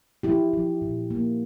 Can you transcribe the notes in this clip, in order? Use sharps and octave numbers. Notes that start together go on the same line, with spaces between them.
F3 E4 G4
F3
A#2
A#3